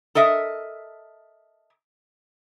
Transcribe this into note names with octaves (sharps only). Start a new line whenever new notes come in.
A4 A#4 D#5 E5